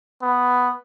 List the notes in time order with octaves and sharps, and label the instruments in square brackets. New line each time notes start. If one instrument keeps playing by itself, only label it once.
[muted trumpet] B3